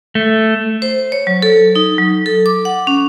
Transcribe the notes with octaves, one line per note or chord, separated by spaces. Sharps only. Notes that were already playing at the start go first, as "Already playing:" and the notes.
A3
C5
C#5
F#3
A4
D#4
F#3
A4
D6
F#5
C#4